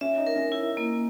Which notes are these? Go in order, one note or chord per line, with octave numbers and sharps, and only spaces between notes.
C#4 E5
D#4
A#4
C#4
E4
A#3